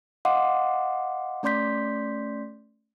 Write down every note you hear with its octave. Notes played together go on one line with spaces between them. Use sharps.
D#5 F5 F#5 C6 D6
A3 C#4 D5 C6 G6 B6